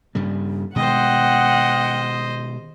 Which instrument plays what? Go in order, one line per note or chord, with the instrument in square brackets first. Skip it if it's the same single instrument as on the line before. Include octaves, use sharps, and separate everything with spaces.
[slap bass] G2 C#3 G3
[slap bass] B2 D#3 G#3 [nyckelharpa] C5 D#5 [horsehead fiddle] F#5 [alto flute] G5